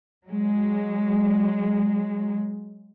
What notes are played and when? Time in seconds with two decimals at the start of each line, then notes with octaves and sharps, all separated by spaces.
0.29 F#3 G#3